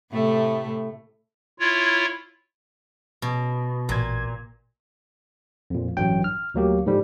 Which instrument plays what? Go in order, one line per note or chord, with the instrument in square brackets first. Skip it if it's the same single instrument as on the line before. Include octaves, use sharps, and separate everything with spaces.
[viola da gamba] A2 C3 A3
[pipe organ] E4 F4 C#5
[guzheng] B2
[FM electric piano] A1 G#6 [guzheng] A#2
[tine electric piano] F2 A#2
A1 G2 F#3 G5
F6
D2 F#3 A#3 G4
G#2 D3 F3 G3